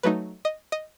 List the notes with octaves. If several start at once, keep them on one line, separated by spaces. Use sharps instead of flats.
F#3 A3 D#4 B4
D#5
D#5